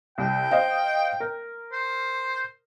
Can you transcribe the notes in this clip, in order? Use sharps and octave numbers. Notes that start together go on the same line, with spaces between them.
C2 G5
C5 D#5 F5
A#4
C5